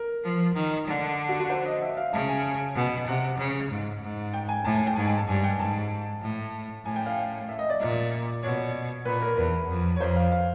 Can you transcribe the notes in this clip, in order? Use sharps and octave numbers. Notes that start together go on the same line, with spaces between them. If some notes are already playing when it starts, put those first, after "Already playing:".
Already playing: A#4
F3
D#3
D3
F#4
F#4
C5
D#5
E5
F5
C#3 A5
G#5
B2
C3 F#5
C#3
G#2
G#2
G5
G#5
A2 A5
G#5
G5
G#2 G#5
G#5
A5
G2 G#5
G5
G#2 A5
A2
A2 G#5
G5
F5
E5
D#5
D5
A#2
B2 C#5
A#2 B4
A#4
E2 B4
F2
C#5
F2 C5
F5
F5